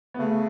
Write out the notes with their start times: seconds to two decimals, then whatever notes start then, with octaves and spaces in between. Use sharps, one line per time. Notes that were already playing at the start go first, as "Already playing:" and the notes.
0.14 B3
0.19 C#3 A3